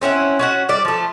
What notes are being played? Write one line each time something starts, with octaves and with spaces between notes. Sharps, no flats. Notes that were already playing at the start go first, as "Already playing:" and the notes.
C4 C#4 E4 F#5
C#4 F#4 F#5
G3 D5
F3 A3